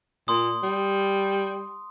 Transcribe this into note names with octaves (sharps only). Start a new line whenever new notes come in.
A#2 C6 D#6
G3